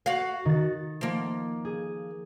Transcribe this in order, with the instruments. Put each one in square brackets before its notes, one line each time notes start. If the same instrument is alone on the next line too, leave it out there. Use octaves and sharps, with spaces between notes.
[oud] F#4 F5
[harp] D#3 A6
[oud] F3 A#3
[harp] G#4